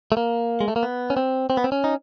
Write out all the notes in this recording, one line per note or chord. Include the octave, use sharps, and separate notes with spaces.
A3
A#3
G#3
A3
A#3
B3
C#4
C4
C4
B3
C4
C#4
D#4